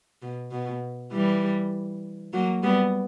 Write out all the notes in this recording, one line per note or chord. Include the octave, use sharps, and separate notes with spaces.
B2
B2
E3 G3
F#3 A#3
G3 B3